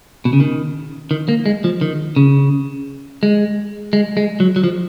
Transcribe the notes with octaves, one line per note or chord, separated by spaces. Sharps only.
B2
C#3
D#3
D#3
A#3
G#3
F3
D#3
C#3
G#3
G#3
G#3
F#3
F#3
F3